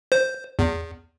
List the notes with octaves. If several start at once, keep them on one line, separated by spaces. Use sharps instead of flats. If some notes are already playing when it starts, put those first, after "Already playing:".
C5
E2